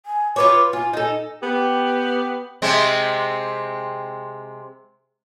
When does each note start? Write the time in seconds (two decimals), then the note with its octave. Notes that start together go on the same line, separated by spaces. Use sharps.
0.06 G#5
0.36 F4 B4 C#5 D6
0.73 F4 G#5
0.93 D#4 A4
1.43 B3 G4
2.62 C3 G#3 C4